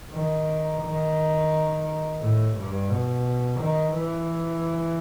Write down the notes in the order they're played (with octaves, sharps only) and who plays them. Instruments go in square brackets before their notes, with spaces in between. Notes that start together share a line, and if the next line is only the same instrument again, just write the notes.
[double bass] D#3
D#3
A2
G2
B2
D#3
E3